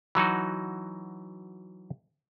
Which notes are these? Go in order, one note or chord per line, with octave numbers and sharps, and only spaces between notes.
E3 F#3 D#4 F#4